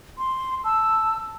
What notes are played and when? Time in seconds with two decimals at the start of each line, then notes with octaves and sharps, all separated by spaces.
0.18 C6
0.64 A5 E6